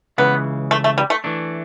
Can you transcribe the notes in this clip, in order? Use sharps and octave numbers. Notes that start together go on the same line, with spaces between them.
C#2 C#3 E3 B3
A3
A3
G3
A3
E3 A3 D4